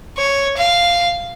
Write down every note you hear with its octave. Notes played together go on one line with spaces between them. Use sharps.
C#5
F5